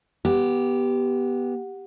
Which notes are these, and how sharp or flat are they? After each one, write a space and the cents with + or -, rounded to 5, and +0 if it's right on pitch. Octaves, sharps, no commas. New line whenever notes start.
B3 -15 G4 +0